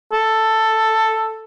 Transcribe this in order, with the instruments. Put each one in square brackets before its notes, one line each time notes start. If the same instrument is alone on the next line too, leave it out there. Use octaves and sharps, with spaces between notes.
[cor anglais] A4